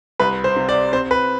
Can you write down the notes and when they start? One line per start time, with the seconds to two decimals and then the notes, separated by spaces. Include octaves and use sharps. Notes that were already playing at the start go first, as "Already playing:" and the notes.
0.20 C2 B4
0.44 C5
0.56 C3
0.69 D5
0.93 C4 C5
1.11 B4